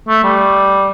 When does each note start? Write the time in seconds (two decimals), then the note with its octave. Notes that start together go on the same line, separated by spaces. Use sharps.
0.08 A3
0.23 G3